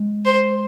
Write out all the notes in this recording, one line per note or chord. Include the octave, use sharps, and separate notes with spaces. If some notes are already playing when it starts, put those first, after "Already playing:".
Already playing: G#3
C5